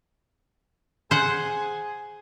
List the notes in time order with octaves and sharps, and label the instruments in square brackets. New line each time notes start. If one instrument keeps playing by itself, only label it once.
[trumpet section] G#4 G#5 [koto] C5 F#5